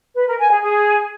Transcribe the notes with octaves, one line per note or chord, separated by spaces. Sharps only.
B4
A#4
G#5
G#4
G#4